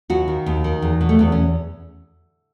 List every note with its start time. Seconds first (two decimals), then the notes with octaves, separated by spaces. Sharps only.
0.10 D#2 F#4
0.28 D#3
0.46 D#2
0.64 D#3
0.82 E2
1.01 B2
1.09 A3
1.19 E2 B3
1.32 C#4